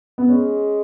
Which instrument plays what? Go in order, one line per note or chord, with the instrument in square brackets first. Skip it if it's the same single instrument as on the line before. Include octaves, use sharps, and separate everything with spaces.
[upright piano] B3
[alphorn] G#3 [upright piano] C#4